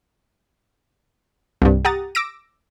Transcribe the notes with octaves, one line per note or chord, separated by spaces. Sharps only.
C2 G2
G4 F#5 A#5 D#6 A6
D6 E6 A#6 D7